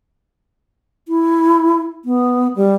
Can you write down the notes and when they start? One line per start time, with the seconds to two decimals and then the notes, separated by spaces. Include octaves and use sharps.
1.08 E4
2.05 B3
2.56 G3